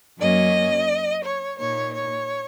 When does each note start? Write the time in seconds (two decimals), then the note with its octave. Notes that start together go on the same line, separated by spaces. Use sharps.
0.19 F#2 F#3 A#3 C#4 D#5
1.24 C#5
1.58 A#2 A#3 D#4 C#5
1.93 C#5